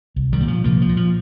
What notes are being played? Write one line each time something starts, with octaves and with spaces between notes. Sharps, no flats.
C2
D#3 G3
A#2
F3
C2 F3 A#3
F3
A#2
F3